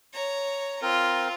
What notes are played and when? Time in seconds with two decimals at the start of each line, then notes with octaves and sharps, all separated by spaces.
0.13 C#5 A#5
0.82 C4 F4 A#4